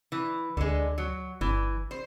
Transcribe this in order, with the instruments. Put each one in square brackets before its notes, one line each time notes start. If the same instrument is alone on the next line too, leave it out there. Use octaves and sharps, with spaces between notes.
[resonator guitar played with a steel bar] E3
[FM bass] D2 [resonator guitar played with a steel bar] D3 G#3
[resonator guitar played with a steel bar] F#3
[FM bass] G1 [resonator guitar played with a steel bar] E3
[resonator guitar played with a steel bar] C5